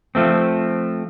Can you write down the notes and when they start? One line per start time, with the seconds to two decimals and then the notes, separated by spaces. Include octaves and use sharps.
0.15 F3 A3 C4